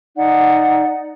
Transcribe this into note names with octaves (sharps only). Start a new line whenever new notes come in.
D#4 D5 F#5